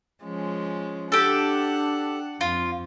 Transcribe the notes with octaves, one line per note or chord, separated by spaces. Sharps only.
F3 G#3 C#4
D4 G4 A4 F#5
F2 F4